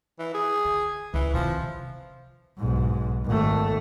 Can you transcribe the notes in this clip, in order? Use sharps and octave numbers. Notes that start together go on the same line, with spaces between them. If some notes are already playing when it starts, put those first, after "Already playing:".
E3
G#4
D3
C#2 E3
C3 D#3 F3
B1 G#2
G#1 A3